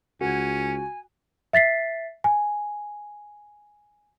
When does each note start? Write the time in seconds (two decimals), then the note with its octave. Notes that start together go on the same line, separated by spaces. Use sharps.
0.21 C#2 C#4 F#4 G#5
1.53 E5 A6 B6 C7
2.24 G#5